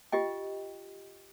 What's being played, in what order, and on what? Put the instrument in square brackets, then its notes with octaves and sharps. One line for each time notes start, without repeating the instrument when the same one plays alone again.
[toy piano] F4 G4 D#5 G5